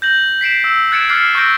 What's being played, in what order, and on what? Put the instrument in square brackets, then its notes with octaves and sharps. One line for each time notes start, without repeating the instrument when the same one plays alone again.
[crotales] G6 A#6 F#7
B6 C7 D7 E7
E6
F#6 G#6 A6 C#7 D7 E7
D6 F6 F#6 A6 C7 C#7
C#6 E6 G6 A#6 D7